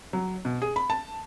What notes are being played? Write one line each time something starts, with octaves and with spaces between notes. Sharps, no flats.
F#3
B2
G#4
B5
A5